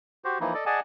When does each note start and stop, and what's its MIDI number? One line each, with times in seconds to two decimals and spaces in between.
0.25 0.39 66
0.25 0.39 67
0.25 0.39 72
0.40 0.54 52
0.40 0.54 53
0.40 0.54 58
0.40 0.54 63
0.40 0.54 64
0.54 0.65 69
0.54 0.65 74
0.54 0.65 75
0.66 0.80 68
0.66 0.80 74
0.66 0.80 75
0.66 0.80 78
0.66 0.80 80
0.66 0.80 81